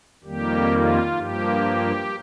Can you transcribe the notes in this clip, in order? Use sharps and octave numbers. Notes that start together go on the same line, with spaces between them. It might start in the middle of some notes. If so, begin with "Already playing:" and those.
F2 D#3 G3 A#3 G4
F4
G2 F3 A#3 G4